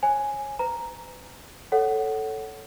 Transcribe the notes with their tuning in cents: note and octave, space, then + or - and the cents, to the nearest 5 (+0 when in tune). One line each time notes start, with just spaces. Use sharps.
C#5 -30 G#5 +0
B4 +35 A#5 +0
A4 +0 C#5 +10 F#5 +15